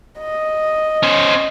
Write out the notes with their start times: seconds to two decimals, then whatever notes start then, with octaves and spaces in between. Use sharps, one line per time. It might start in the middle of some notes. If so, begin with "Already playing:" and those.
0.19 D#5
1.03 C#4 C5